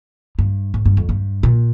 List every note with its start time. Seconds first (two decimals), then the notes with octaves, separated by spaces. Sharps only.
0.39 G2
0.74 G#2
0.86 G2
0.97 F2
1.09 G2
1.43 A#2